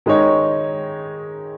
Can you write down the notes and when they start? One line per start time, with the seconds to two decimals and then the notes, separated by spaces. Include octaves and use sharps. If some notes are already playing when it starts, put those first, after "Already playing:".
0.06 D#3 G#3 D#4 C#5